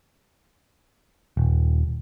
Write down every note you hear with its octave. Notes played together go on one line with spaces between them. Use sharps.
D#1